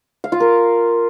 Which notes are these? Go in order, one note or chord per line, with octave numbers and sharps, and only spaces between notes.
F5
F4
A#4